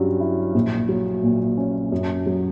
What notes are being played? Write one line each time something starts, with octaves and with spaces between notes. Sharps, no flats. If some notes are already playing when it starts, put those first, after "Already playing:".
Already playing: G2 F#3 C#4
E4
A#1
F#3
A#2
C#4
F#2
F#3